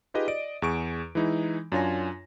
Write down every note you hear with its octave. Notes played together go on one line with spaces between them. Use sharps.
D#4 F4 G4 G#4 B4 D#5
D5 D#5 D7
E2 G#4 C#6 D7
E3 G#3 D#4 E4
F#2 D4 F4 C#5 G#5 A#6